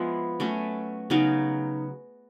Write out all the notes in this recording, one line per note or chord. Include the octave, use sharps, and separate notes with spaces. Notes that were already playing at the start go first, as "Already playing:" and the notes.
Already playing: F3 G#3 B3 E4
F#3 A3 C#4
C#3 F#3 B3 D#4